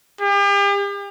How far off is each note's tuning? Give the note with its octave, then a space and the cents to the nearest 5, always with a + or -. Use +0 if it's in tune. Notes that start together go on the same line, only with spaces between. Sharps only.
G4 +40